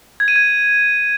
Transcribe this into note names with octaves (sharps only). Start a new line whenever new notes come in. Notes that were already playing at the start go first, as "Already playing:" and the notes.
G#6
D#7
G#6